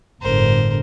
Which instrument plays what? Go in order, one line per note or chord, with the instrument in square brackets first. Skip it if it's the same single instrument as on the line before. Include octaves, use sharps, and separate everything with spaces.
[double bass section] G1 A2 D3 [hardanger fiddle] A#4 C5